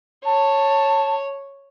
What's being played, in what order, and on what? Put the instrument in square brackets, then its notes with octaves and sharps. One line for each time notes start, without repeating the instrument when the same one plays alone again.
[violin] C#5 [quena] A5